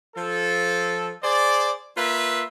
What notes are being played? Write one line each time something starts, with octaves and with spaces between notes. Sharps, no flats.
F3 A4
G#4 C5 D5
A#3 F4 B4 E5